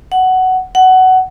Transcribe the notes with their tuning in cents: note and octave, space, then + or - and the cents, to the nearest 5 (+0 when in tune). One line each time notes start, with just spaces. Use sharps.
F#5 +10
F#5 +15